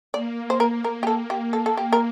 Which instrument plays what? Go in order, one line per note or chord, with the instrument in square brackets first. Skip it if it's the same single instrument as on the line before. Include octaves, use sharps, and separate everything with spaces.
[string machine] A#3 [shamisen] D5
[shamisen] C5
A#4
A#4
G4
A4
G4
A4
A4
G4
A#4